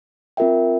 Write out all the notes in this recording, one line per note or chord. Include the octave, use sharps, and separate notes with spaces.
C4 F4 A#4 E5 G5